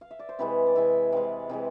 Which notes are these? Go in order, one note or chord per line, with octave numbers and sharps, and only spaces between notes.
F5
E5
D5
C5
C3 E3 G#3 B4
D5
C3 E3 G#3 E5
C3 E3 G#3 F5
C3 E3 G#3